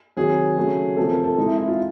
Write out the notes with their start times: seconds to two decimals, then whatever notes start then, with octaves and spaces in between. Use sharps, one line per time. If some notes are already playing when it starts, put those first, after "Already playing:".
0.17 C3 D#3 F#3 G#4
0.57 C#3 F#3 A3
0.97 C3 F3 A3 A4
1.11 A#4
1.24 A4
1.37 C3 E3 G#3 D#4
1.47 E4
1.58 E4
1.68 F4